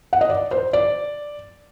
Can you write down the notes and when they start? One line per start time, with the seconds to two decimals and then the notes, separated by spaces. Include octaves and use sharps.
0.13 F#5
0.21 D#5
0.29 D5
0.51 C5
0.73 D5